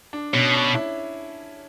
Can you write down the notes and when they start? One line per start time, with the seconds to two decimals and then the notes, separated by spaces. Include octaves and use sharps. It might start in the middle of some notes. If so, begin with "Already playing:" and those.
0.13 D4
0.33 B2 C#4
0.54 D4
0.74 E4